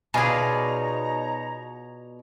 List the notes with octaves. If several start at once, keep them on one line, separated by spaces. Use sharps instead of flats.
B2 D#4 F4 G#4 C#5 D5 G#5 A#5